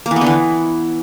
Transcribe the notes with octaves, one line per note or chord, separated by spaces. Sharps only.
A#3
E3
B3
D3
E3